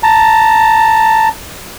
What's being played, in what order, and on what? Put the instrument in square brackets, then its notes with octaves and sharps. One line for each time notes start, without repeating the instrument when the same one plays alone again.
[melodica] A5 A#5